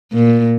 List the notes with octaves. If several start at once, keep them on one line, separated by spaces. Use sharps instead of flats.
A#2